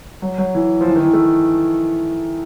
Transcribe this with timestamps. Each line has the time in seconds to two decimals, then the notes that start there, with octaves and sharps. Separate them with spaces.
0.22 F#3
0.38 F#3
0.55 E3
0.81 F3
0.88 E3
0.96 D#3
1.05 E3
1.13 A3